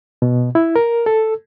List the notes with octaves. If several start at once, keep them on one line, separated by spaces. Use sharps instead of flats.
B2
E4
A#4
A4